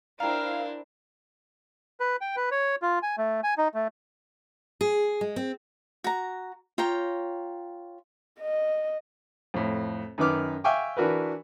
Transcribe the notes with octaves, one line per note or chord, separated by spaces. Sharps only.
D4 E4 A#4 C5 F5 G5 A#5
B4
G5
B4
C#5
F4
G#5
A3
G#5
D#4
A3
G#4
G#3
C4
F#4 A#5
F4 C#5 G5 A#5
D#5
F2 A2
F#2 D#3 B4 D6 F6
E5 F5 G5 G#5 C#6 D6
E3 D4 F#4 A#4 B4